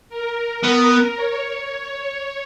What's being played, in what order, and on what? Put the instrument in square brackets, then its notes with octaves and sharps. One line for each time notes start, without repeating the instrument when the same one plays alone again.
[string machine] A#4
[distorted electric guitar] B3
[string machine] C#5